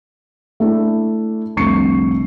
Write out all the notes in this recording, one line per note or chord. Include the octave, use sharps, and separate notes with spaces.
A3 D4 E4
F1 C2 D3 C#6 C7 C#7